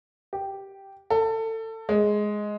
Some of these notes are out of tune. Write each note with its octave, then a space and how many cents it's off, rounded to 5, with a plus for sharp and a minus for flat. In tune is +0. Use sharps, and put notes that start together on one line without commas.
G4 -5
A4 +25
G#3 +5